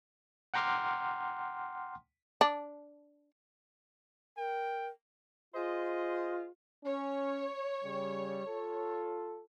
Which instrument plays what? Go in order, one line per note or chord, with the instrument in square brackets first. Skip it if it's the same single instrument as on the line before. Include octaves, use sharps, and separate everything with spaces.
[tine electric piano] F#5 G5 A#5 C6 D6 F6
[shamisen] D4
[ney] A#4 [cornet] G5
[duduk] F4 [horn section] G#4 C5 D#5
[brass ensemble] C#4 [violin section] C#5
[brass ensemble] C#3 G3
F4 A4